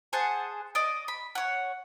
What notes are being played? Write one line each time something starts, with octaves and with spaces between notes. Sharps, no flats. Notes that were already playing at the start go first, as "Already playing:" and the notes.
G#4 C5 F#5 A5
D5 D#5
B5
C#5 F#5